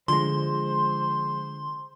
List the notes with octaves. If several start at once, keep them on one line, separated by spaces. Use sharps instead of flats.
D3 F3 G#3 C5 C6